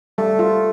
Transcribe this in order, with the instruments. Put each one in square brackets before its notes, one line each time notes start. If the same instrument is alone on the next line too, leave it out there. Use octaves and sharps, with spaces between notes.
[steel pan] G3 [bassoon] A3
[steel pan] F4